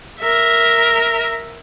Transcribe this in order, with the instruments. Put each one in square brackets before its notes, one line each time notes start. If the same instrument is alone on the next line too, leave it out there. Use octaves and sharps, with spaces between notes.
[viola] A#4 E5